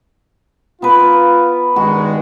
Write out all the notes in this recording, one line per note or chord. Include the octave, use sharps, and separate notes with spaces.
B3 F4 A#4 B4
G2 D#3 G#3 F#4